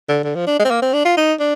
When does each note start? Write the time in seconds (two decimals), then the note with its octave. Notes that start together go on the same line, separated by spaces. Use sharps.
0.09 D3
0.24 D3
0.35 F3
0.47 D4
0.60 G#3
0.65 C4
0.71 A#3
0.83 C4
0.94 D4
1.05 F4
1.17 D#4
1.40 D4